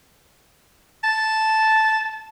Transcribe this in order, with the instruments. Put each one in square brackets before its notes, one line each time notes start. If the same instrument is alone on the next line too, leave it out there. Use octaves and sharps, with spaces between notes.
[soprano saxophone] A5